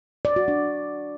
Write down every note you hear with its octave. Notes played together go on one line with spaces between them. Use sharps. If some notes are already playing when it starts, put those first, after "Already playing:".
D5
F#4
D4